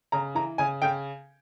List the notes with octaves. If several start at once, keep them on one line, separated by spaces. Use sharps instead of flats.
C#3 A#5
E3 A#5
C#3 G#5
C#3 G5